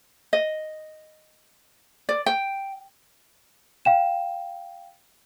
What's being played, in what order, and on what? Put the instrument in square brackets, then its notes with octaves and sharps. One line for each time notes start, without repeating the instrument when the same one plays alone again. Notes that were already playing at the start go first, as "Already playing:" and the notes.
[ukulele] D#5
D5
G5
[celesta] F5 G5 E7